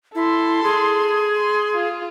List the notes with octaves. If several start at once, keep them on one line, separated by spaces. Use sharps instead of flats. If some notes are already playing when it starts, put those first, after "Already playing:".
E4 A4 C6
G#4
C6
F4